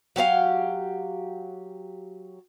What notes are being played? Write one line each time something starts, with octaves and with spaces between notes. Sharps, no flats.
F#3 G4 C5 F5